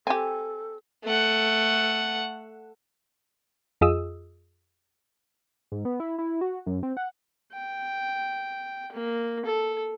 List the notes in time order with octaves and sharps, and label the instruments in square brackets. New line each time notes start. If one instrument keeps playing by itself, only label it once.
[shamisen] C4 G4 [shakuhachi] A4 [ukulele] G#5
[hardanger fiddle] A3 F#5
[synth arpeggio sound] F2 F4 G#4 D#5 D#6 E6
[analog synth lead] G#2
B3
E4
E4
F#4
F#2
C4
F#5
[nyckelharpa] G5
A#3
A4